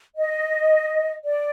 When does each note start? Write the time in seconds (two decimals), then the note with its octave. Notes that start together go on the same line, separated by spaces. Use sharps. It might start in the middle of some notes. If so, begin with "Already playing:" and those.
0.16 D#5
1.24 D5